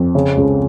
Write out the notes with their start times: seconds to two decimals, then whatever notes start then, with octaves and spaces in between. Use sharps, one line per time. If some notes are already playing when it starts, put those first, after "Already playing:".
Already playing: F2
0.15 C#3
0.37 C#2